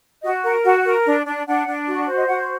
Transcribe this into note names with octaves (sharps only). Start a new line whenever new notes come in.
F#4 D#5
A#4 F#5
F#4 F#5
A#4
D4
D4
D4 F#5
D4
F#4
C5
D#5
F#4 F#5